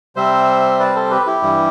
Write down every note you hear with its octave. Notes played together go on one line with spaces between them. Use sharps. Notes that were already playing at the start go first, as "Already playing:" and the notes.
C3 G3 C4 C5 E5
B4 D5
A4 C5
G4 B4
E4 G4
G2 E3 G3